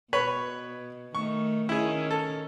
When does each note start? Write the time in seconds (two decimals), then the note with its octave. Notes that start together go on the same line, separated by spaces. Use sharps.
0.13 B2 B4 C#5 B5
1.15 D#3 A3 C#6
1.69 D#3 C#4 E4 G#4
2.11 A4